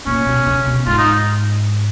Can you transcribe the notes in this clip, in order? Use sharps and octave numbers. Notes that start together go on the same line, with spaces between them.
A#2 C#4
B2
C#3
B2
G#2 F4
D#4